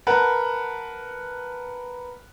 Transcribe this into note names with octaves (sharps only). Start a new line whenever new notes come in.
A#4 B4 F#5 A5 F#6